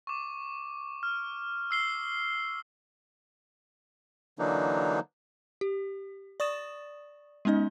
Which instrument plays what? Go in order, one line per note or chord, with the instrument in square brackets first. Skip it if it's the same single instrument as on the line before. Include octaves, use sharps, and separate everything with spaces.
[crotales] C#6 D6
F6
E6 C7 G7
[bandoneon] D3 E3 F#3 A#3 D4 D#4
[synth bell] G4
D5 C#6 D#6 A6 E7
G#3 B3 C#4 D#4 D#5